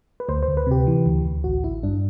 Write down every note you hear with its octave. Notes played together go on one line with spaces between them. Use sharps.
B4
D2 C5
C5
D2
B4
C3 G4
E3
D2
D2
A1 F#4
A1 E4
G2 D4